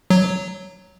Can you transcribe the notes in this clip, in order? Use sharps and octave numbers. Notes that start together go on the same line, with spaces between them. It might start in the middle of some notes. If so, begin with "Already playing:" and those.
F#3